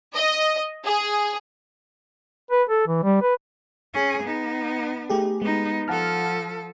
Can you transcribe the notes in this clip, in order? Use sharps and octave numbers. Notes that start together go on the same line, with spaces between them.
D#5
G#4
B4
A4
E3
G3
B4
C#4 G#4
B3 D#4
A3 G4 G#4
G#3 B3 D#4
F3 A4 F#5 A5 F6